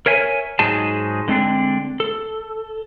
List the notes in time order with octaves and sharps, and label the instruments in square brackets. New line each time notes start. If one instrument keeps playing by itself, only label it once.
[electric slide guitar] A#4 C#5 E5 G#5
G#2 F#3 G#3 D#4 G#4 A5
D3 G#3 C4 D4
A4